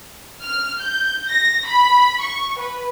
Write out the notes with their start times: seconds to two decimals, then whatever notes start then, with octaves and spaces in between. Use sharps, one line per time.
0.43 F6
0.81 G6
1.30 A#6
1.67 B5
2.21 C#6
2.60 B4